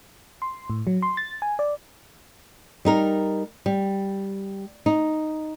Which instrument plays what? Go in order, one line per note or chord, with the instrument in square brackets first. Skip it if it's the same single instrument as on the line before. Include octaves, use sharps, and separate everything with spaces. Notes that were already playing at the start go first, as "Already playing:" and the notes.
[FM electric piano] C6
A2
F#3
C6
A6
G#5
D5
[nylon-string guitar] G3 D#4 A#4
G3
D#4